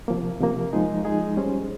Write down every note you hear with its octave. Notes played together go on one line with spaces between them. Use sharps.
C3 F3 A#3
C3 F3 A#3
F3 G#3 D#4 G#4
F3 G#3 D#4 G#4
G3 C#4 G#4 C5